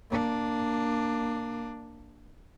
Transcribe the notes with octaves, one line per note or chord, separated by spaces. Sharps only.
A#3 D4